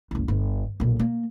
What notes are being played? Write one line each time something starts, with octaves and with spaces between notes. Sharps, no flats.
F#1 C2
G1
B1 A#2
A#3